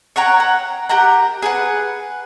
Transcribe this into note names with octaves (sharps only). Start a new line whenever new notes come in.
C#5 F#5 G5 A#5
F#5
G4 A#4 F#5 A#5
G#4 B4 F#5